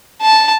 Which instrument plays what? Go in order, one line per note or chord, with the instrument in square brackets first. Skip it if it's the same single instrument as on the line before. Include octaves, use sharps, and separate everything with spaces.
[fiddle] A5